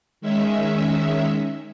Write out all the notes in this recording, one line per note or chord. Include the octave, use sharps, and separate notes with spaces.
D#3 G#3 C#4 E5